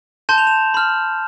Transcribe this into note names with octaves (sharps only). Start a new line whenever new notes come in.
A5 C6 G6 E7
F7
E7
B5 F6